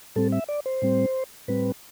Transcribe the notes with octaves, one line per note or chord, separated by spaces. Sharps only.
A2 G3 C4 A4
E5
D5
C5
A2 G3 C4
A2 G3 C4 B4